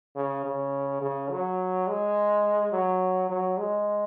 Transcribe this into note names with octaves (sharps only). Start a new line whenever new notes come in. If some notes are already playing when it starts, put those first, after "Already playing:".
C#3
C#3
C#3
F#3
G#3
F#3
F#3
G#3